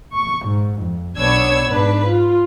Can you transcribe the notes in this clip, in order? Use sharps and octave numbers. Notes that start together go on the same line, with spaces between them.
C#6
G#2
F2
B1 B3 D4 C#5 E6 G#6
G#2 D4 B4
F4